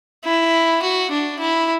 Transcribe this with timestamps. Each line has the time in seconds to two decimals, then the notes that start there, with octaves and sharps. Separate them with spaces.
0.25 E4
0.82 F#4
1.11 D4
1.40 E4